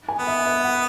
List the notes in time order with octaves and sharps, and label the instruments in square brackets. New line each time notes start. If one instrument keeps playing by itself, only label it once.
[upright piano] G#5
[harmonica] B3
[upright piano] E5
E5
F#5